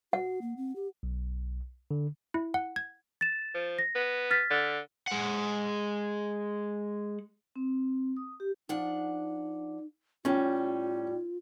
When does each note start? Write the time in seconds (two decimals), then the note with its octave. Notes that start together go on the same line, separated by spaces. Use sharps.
0.13 F#4 F#5
0.42 A#3
0.57 C4
0.76 G4
1.03 B1
1.91 D3
2.34 E4
2.54 F#5
2.76 G#6
3.21 A6 E7
3.54 F3
3.79 A#6
3.95 B3
4.31 F6 A6 B6
4.51 D3
5.08 G#3 F#5
7.56 C4
8.17 D#6
8.40 G4
8.69 F3 D4 D#4 F#5
10.25 A2 G3 C#4 F4